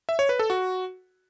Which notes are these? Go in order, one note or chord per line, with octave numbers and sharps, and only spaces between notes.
E5
C#5
B4
A4
F#4